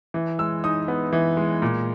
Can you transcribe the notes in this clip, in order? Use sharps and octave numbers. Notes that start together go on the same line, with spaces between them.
E3
G#3 E6
D#4 D#6
B3
E3
G#3
A#2